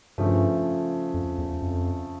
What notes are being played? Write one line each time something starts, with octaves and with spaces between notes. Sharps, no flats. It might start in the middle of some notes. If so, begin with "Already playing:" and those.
G2 C#3 F3 A3
F2
E2
F2